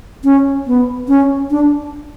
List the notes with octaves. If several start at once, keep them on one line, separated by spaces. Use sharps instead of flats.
C#4
B3
C#4
D4